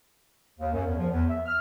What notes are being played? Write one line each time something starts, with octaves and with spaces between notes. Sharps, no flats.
D#2
F#2
E2
F3
E2
E5
F6